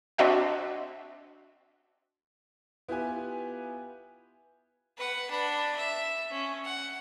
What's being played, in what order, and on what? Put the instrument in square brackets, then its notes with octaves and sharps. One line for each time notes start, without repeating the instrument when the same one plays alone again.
[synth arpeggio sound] C4 D4 F#4 D#5 E5 F#5
[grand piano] B3 E4 F4 G4 B4 G#5
[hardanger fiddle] B4 F#5
D4 B5
E5
C#4
F#5